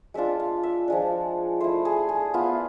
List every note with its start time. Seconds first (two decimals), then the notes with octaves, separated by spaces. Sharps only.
0.14 G#3 D4 F4 E5
0.40 F5
0.63 E5
0.88 F3 G#3 D4
1.61 A3 E4 C5
1.85 G#4
2.09 G#4
2.34 B3 E4 F4